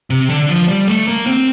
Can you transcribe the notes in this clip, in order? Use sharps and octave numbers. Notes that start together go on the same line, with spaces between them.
C3
D3
F3
G3
A3
A#3
C4